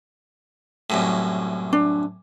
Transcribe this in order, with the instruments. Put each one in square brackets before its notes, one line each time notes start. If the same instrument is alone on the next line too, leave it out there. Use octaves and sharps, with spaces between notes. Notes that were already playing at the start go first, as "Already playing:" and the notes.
[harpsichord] C2 F#2 A2
[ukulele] D4